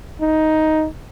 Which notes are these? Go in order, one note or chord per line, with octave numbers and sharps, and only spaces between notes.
D#4